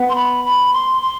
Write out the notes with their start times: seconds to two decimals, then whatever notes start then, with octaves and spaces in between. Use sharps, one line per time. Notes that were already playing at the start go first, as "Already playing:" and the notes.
Already playing: B3
0.09 C6
0.15 B5
0.45 B5
0.73 C6
1.02 C6